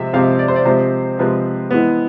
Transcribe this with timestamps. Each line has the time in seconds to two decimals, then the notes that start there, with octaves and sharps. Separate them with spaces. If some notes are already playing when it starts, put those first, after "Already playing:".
Already playing: C3 F3 G#3 C4 E5
0.13 C3 F3 G#3 C4 F5
0.39 D5
0.48 C5
0.56 D5
0.65 C3 F3 G#3 C5
1.19 C3 F3 G#3 B4
1.71 E3 G#3 B3